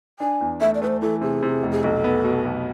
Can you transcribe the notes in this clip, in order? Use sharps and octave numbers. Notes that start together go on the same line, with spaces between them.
D4 G#5
E2
A3 E5
D5
A3 B4
C5
E3 A4
C3 G#4
C3
F1
G#4
B1 A4
B3
B2
B1